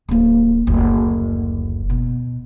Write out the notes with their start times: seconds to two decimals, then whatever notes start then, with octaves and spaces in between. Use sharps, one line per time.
0.09 D1 A#3
0.67 F#1 D2
1.89 B2